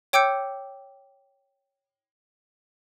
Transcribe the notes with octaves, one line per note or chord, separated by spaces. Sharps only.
C#5 G5 D6 E6 G6 C#7